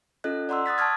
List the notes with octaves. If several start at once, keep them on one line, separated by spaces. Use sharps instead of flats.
C#4 F4 A4 D#5 F#6
D5 F#5 A#5 C6 D6 E6
D#6 F#6 A6 B6
A5 C#6 D#6 F6 G#6